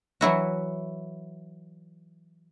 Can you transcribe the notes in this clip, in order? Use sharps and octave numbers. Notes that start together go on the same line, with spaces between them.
E3 F#3 E4 F#4